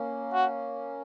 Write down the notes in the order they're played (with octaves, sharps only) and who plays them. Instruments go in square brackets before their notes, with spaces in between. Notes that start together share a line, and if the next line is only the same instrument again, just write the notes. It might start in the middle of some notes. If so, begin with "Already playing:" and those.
Already playing: [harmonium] A#3 C#4
[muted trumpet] F#4